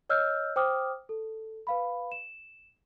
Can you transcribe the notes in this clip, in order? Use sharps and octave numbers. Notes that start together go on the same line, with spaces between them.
C#5 D#5 E6 F6 G6
C5 G5 D6 D#6 F6
A4
B4 F5 B5
E7